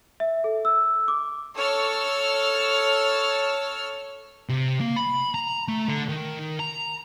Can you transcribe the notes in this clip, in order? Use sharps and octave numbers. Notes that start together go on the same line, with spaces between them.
E5
A4
E6
D6
A4 C#5 E6 F6
C3
A#3
B5
A#5
A3
D3
D#3
A#5